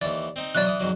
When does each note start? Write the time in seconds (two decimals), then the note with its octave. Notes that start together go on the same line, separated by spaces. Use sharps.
0.01 D#2 E3 D5
0.36 C4 D#4
0.55 B2 E3 F#3 D5 F#6
0.67 E3 D#6
0.80 F2 G#2 F#3